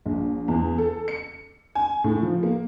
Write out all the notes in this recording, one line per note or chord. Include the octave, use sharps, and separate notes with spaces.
A#1
E2
A4
C#7
G#5
A2
F3
A#3